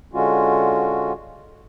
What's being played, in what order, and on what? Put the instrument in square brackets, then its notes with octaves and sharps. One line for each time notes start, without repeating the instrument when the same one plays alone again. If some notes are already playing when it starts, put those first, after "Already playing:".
[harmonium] D3 G#3 C#4 F4 F#4